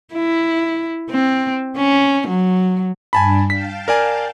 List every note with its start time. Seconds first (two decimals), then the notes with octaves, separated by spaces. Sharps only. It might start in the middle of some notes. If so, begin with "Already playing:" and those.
0.13 E4
1.10 C4
1.76 C#4
2.28 F#3
3.13 G2 D4 G#5 A5 B5
3.50 F5 G5 A5 B6
3.88 A#4 D5 G#5